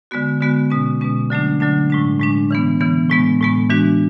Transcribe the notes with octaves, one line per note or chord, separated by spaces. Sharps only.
D3 G#3 B3 F#4
D3 G#3 B3 F#4
B2 G#3 C#4
B2 G#3 C#4
D3 F#3 A3 D4
D3 F#3 A3 D4
A2 G#3 D4
A2 G#3 D4
C#3 E3 B3
C#3 E3 B3
A2 G#3 B3
A2 G#3 B3
E3 G#3 D4 F#4